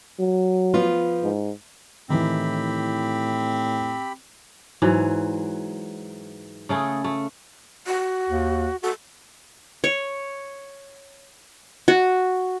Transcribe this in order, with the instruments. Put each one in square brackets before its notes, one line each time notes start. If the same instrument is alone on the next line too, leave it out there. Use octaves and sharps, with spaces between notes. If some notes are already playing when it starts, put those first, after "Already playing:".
[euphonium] F#3
[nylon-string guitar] F3 B3 F4
[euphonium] G#2
[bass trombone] A2 [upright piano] D#3 E3 [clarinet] C4 [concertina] G4 B5
[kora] G#2 E3 F#3
C#3 A3 G#4 A4
A3
[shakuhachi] F#4
[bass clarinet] D#2
[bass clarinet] F#4 [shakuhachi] A4
[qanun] C#5
F#4